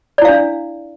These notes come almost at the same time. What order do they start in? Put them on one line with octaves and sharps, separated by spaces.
D5 E4 F5 D4